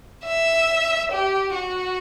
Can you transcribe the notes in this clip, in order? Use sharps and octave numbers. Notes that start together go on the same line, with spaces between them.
E5
G4
F#4